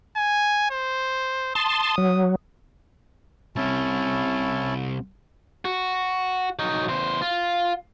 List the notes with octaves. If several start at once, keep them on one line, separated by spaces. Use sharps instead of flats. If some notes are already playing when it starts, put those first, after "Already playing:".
G#5
C5
A5 C6 D#6
F#3
C2 C3 C#4 E4 A5
F#4
F#3 D#4
E2 C5
F4